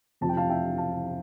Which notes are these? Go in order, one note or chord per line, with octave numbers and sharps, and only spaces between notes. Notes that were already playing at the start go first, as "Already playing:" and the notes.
F2 C3 F3 A5
G5
F5 A5
E5 G5
F5 A5